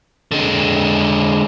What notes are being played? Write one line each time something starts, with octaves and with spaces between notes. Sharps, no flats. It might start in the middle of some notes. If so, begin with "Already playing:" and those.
D3 G#3